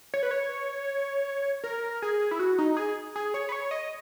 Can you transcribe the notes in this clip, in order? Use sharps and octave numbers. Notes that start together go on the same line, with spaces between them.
C#5
B4
C#5
A#4
G#4
E4
F#4
D#4
G#4
G#4
C#5
B4
C#5
D#5